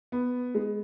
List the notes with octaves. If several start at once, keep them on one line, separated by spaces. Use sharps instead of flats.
B3
G#3